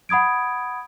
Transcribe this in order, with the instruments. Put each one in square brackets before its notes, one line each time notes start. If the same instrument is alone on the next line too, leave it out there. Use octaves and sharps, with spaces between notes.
[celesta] F#5 B5 D#6 G#6 D7